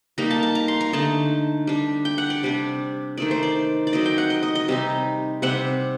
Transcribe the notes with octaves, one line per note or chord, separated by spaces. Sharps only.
G3 A#3 D#4 A#5
A5
A5
A#5
C6
A#5
D3 A3 D#4 A5
G3 D4
G5
F#5
D5
C3 G3 D4
D#3 A3 D#4 D5
C5
D5
D5
F#3 C4 D#4 D#5
G5
F#5
D#5
D#5
D#5
C3 G3 C4 D#4
C3 G3 C4 F#5